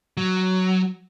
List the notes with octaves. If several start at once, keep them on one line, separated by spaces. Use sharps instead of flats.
F#3